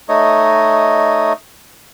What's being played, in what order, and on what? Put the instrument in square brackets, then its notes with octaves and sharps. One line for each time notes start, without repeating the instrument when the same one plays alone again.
[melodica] A3 D#4 C#5 D#5